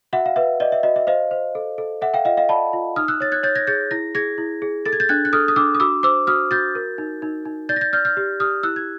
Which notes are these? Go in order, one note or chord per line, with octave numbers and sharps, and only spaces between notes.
F#4 E5 F#5
F5
B4 E5
D5 D#5
E5
F#4 D#5
E5
C5 D#5 F5
C5
A4
A4
A4 E5 F#5
F5 G5
F4 D#5 F5
D#5 F5
D5 A5 B5
F4
D#4 D#6 F6
E6 F#6
C#5 A6
F#6 G#6
C#5 G6 A6
G#6 A#6
G#4 G6 A6
E4 A#6
G#4 G#6 A#6
E4
G#4
A4 A6
G#6
G6 A6
D4 F#6 G#6
F#6
A4 D#6 F6
D#6
D4 D6 E6
D#6
F#4 D6 E6
C5 D6 E6
F#4 D#6 F6
F#4 G6 A6
A#4
D#4
D#4
D#4
D5 G6 A6
A#6
G6 A6
D5 F6 G6
F6 G6
G4
G4 D#6 F6
E4 E6 F#6
G#6